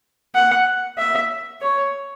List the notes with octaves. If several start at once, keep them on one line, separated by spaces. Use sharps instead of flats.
F#5
E5
C#5